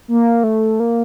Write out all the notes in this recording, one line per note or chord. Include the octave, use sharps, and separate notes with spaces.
A#3
A3
A#3